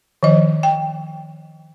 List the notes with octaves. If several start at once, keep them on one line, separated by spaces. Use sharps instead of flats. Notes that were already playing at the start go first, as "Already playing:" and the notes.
D#3 F3 D#5
G5